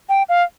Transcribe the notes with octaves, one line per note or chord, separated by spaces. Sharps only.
G5
F5